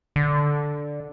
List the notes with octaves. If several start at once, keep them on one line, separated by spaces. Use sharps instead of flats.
D3